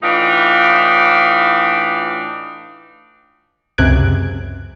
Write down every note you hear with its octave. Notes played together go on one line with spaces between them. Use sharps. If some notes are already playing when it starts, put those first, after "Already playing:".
A2 E3 D4 D#4 F4
C#2 F#2 C3 F#6 G#6 D7